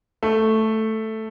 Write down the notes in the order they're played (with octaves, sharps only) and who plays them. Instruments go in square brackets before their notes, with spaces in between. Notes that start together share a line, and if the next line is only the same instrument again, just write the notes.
[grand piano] A3